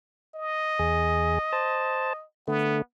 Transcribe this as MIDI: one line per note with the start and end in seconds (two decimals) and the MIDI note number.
0.35 2.24 75
0.79 1.39 40
0.79 1.39 68
1.52 2.13 72
1.52 2.13 81
2.48 2.82 50
2.48 2.82 57
2.48 2.80 59